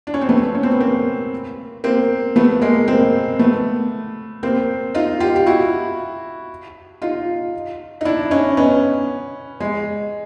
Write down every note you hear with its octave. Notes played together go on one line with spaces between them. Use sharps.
D4
C#4
C4
A3 B3
C#4
C4
B3
A#3 C4
A#3 C4
A3 B3
G#3 A#3
A#3 C4
A3 B3
A#3 C4
D#4 F4
F4 G4
G4
E4 F#4
D#4 F4
D#4
D4 E4
C#4 D#4
B3 C#4
G#3